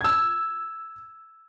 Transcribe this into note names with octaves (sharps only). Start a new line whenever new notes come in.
E6 G#6